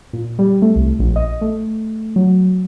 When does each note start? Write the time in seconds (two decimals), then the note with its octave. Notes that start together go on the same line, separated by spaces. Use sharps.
0.13 A#2
0.39 G3
0.62 A3
0.76 C2
0.99 A#1
1.16 D#5
1.41 A3
2.16 F#3